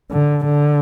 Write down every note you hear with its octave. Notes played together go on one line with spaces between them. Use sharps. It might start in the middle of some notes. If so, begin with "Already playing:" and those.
D3
D3